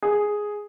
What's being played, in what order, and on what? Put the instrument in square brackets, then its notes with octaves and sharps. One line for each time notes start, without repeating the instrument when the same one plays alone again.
[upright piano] G#4